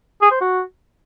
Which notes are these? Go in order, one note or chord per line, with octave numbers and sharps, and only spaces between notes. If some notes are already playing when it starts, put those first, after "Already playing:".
G#4
C5
F#4